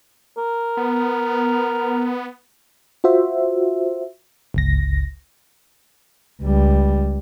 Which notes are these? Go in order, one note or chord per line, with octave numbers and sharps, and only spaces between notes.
A#4
B3
F4 F#4 C5 E5
G1 C#2 A#6
C#2 G3